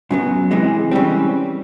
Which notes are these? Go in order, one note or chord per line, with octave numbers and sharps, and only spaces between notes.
F#2 C#3 F#3 B3
C#2 C3 E3 G#3
C#3 E3 G3 C4